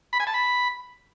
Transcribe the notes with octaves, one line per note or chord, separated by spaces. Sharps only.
B5
G#5
A5
B5